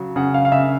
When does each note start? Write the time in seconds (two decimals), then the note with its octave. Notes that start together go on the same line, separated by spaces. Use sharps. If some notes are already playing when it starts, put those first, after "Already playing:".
Already playing: C#3 F#3
0.16 C#3 F#5
0.34 F5
0.45 F5
0.52 C#3 E5